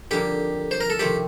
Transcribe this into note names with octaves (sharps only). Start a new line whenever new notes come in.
F2 D3 G3 A#3 D#4 G4
C5
A#4
A4
F2 C3 D#3 A3 C4 G4